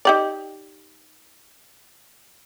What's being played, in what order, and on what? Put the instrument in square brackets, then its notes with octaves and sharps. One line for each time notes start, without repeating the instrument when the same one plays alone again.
[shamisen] D#4 G4 D5